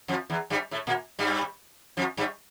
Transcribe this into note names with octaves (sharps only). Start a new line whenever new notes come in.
F2 F3
E2 E3
G2 G3
A2 A3
A#2 A#3
G2 G3
F2 F3
G2 G3